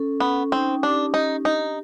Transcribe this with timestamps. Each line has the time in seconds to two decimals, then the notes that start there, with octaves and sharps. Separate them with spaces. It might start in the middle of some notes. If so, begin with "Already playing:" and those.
Already playing: C#4 A4
0.20 B3 C#4
0.52 C4 D#4
0.83 D4 G4
1.14 D#4 G4
1.45 D4 D#4